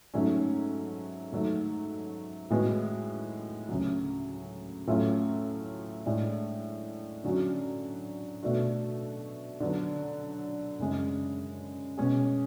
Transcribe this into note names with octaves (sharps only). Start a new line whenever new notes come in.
G#2 F#3 A3 C#4
G#2 F#3 A3
A2 G#3 B3 F#4
D2 C#3 F#3
A2 F#3 A3 C#4 F4
A2 G#3 D4
D3 F#3 C#4 F#4
B2 A3 D4 F#4
D3 F#3 B3
F#2 C#3 G#3
B2 G#3 C#4 G#4